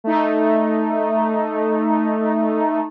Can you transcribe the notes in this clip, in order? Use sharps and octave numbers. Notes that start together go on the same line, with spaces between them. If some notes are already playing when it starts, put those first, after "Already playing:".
A3 D#4